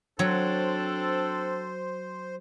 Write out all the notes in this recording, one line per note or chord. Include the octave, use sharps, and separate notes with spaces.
F#3 C4 D4 A4 C5